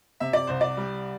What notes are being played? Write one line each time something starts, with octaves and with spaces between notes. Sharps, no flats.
C3 E5
D5
C2 C5
D5
G3